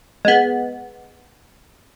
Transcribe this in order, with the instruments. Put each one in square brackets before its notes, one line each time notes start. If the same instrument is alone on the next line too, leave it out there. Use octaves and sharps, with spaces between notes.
[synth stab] G#3 B3